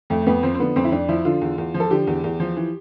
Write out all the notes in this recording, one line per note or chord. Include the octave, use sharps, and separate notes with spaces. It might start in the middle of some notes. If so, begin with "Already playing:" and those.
F2 A3
A3
F2 B3
F3 C4
C4
D3 B3
F2 C4
E4
F2 D4
F3 E4
D3 F4
E2
E2
F3
A4
D3 G4
E2
E2
F3
E3